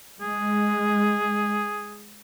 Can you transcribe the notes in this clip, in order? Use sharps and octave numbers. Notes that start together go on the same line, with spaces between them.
G#3 G#4